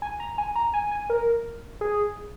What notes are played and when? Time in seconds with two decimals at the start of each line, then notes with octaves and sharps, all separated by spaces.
0.02 G#5
0.20 A#5
0.38 G#5
0.55 A#5
0.74 G#5
0.91 G#5
1.10 A#4
1.81 G#4